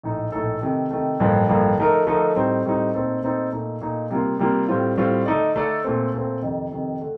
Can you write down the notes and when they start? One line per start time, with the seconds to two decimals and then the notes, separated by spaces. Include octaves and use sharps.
0.03 A#1 A2 A3 D#4 A4
0.32 A#1 A2 A3 D#4 A4
0.62 C3 D#3 A3
0.91 C3 D#3 A3
1.20 A1 G2 D3 F3 A#3
1.48 A1 G2 D3 F3 A#3
1.78 D3 F3 A3 D#4 A#4
2.07 D3 F3 A3 D#4 A#4
2.35 A2 G3 C4 D#4
2.65 A2 G3 C4 D#4
2.94 A#2 A3 C4 D#4 A4
3.23 A#2 A3 C4 D#4 A4
3.52 A#2 A3 D#4
3.81 A#2 A3 D#4
4.11 C3 G3 A#3 F4
4.39 C3 G3 A#3 F4
4.68 A2 G3 C4 F4
4.97 A2 G3 C4 F4
5.26 D3 A3 D#4 A4 D5
5.56 D3 A3 D#4 A4 D5
5.84 A#2 A3 C4
6.14 A#2 A3 C4
6.42 F2 C3 D#3
6.72 F2 C3 D#3
7.01 D3 A3